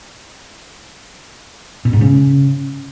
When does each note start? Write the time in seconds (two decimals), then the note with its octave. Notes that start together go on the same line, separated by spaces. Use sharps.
1.85 B2
1.93 G#2
2.01 C#3